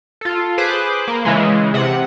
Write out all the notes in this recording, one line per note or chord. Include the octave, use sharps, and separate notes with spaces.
F4 A4
G#4 B4 C5 D6 F#6
A#3
C#3 E3 G#3
C3 F#5